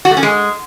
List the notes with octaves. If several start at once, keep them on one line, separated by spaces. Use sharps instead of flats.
F#4
A3
C#4
G#3